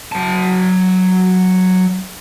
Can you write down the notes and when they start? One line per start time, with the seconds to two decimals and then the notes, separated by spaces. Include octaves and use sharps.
0.12 F#3 A5